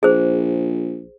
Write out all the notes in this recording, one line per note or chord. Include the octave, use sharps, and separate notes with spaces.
A#1 G#4 C5